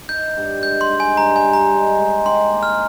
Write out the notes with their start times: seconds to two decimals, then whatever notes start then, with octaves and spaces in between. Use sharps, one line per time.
0.08 D#4 G6
0.37 G2
0.63 G#3 G6
0.81 C6
0.90 D#4
1.00 G#5
1.17 G2 A#5
1.36 G#5
1.45 G2
1.53 A#5
1.72 G#3
1.99 G#3
2.26 D#3 C6
2.53 A#3
2.63 F6